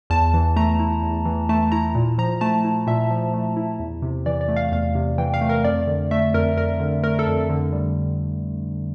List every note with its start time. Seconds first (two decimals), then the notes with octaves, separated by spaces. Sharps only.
0.10 E2 A5
0.34 E3
0.56 A3 A#5
0.80 E4
1.02 E2
1.25 E3
1.49 A3 A5
1.72 E4 A#5
1.95 A#2
2.18 F3 A#5
2.41 A3 A5
2.65 E4
2.87 A#2 E5
3.11 F3
3.34 A3
3.57 E4
3.79 E2
4.02 C3
4.26 E3 D5
4.41 D5
4.49 A3
4.56 F5
4.72 E2 F5
4.95 C3
5.18 E3 G5
5.34 F5
5.41 A3
5.49 A#4
5.64 F2 D5
5.87 D3
6.11 A3 E5
6.34 F2 A#4
6.57 F2 A#4
6.80 D3
7.03 A3 A#4
7.19 A4
7.27 F2
7.49 D3
7.73 G3